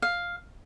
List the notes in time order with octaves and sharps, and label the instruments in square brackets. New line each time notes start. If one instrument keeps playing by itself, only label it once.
[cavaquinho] F5